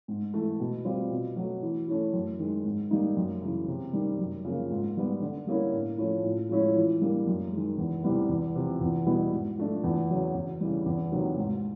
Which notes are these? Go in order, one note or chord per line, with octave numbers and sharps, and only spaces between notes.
G#2
E3 A3
B2
G3 C4 F4
B2
F#3 A3
E3
A3 C#4 E4
F#2
D#3 G#3
G#2
D#3 G3 A#3 D#4
F#2
C#3 E3
C3
D#3 G3
F#2
C#3 F3 A#3
G#2
D#3 G3 B3
D3
G3 A#3 C#4 E4
A2
F3 A3 C#4 E4
A2
F3 G#3 C#4 E4
E3
G3 A#3 D4
F#2
D#3 G#3
E2
C3 E3 G3 B3
E2
C3 F3
E2
B2 G3 B3 E4
G#2
F3 A3 D4
E2
C#3 F#3
E2
C#3 E3 G3
E2
C3 D#3 F#3 A#3
G#2